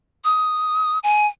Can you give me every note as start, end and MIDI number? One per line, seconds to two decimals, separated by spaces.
0.24 0.99 87
1.03 1.27 80